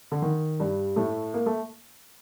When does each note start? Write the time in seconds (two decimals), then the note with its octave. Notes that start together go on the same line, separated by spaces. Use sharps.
0.12 D3
0.22 D#3
0.60 G2 G3
0.96 A2 A3
1.34 A#3
1.46 A3